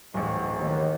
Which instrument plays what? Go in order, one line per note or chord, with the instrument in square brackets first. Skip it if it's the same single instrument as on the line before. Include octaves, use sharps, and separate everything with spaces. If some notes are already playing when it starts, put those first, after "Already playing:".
[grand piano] D1 A1 [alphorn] G#2
[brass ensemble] D#2